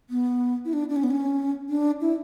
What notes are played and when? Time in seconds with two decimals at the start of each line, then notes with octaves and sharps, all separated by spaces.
0.10 B3
0.65 E4
0.73 D4
0.89 D4
0.96 C#4
1.03 B3
1.11 C#4
1.69 D4
2.01 E4